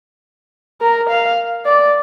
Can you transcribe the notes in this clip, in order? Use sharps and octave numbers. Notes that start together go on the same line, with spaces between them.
A#4
F5
D5